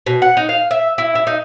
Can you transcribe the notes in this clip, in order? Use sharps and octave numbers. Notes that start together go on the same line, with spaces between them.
B2
F#5
D#4
F5
E5
E4
E4
D#4